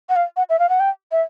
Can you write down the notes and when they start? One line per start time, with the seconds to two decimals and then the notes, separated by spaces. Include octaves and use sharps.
0.09 F#5
0.16 F5
0.37 F#5
0.49 E5
0.59 F5
0.69 F#5
0.80 G5
1.12 E5